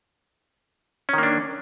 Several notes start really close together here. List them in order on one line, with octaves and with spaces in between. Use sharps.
C#4 D#3 A#3 D4